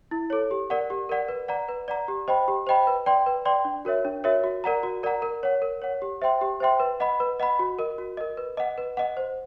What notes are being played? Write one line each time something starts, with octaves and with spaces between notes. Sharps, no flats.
E4
A4 C#5
G4
A#4 D5 F#5
G4
A#4 D5 F#5
B4
D5 F#5 A#5
B4
D5 F#5 A#5
G4
C5 D#5 G5 B5
G4
C5 D#5 G5 B5
B4
D5 G5 C6
B4
D5 G5 C6
D4
F#4 A#4 C#5 E5
D4
F#4 A#4 C#5 E5
F#4
A#4 D5 F#5 A#5
F#4
A#4 D5 F#5 A#5
A#4
C#5 F#5
A#4
C#5 F#5
G4
C5 E5 G5 C6
G4
C5 E5 G5 C6
B4
D#5 F#5 B5
B4
D#5 F#5 B5
F#4
A#4 D#5
F#4
A#4 D#5
B4
D#5 F#5
B4
D#5 F#5
C5